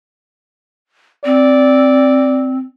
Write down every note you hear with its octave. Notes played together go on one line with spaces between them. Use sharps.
C4 D5